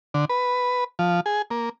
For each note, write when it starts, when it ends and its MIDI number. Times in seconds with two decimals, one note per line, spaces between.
0.14 0.25 50
0.29 0.84 71
0.99 1.20 53
1.26 1.42 68
1.51 1.69 58